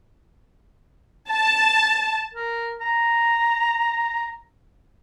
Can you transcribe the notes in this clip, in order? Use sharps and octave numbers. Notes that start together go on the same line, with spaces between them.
A5
A#4
A#5